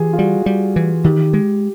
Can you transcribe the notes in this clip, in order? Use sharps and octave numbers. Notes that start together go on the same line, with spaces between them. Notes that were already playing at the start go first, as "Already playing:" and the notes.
Already playing: E3 F4 G4 G#4
F4
G3 F#4
G3
E3
D#3 G4
G#3